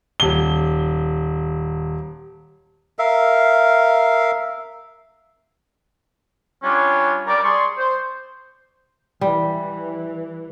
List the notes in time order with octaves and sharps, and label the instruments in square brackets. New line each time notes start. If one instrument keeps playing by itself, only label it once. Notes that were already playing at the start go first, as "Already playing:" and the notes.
[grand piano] D#1 G7
[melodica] A#4 E5 F5
[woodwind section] G3 C#4 D4 F4
G3 A#4 D5
G#4 D5 C6 C#6
C5
[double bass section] E3 [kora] G3